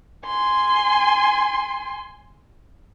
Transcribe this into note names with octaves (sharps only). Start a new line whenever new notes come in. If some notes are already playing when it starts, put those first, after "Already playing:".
G#5 C6